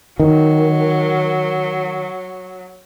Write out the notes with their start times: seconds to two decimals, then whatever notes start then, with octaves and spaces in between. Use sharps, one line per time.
0.20 D#3 F#3